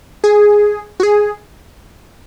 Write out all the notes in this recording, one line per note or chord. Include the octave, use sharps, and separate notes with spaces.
G#4
F#4
G#4